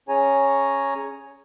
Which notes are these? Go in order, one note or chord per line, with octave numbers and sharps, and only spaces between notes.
C#4 G#4 C#5 G#5 A#5